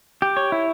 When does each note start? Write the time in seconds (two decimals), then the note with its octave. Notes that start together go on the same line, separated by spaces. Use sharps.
0.22 G4
0.37 C#5
0.52 E4